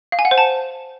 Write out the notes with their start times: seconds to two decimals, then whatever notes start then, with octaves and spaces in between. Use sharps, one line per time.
0.12 F5
0.19 G#5
0.25 F#5
0.31 C5
0.38 A5